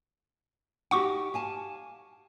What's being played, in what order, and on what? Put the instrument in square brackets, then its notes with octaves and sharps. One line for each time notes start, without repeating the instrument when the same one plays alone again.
[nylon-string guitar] D#4 F#4 G4 [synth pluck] F#5 C#6 D6
[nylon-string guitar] F5 G#5 A5